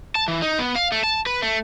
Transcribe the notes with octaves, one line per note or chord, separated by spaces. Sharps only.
A5
E3
D#4
B3
F5
A3
A5
B4
A3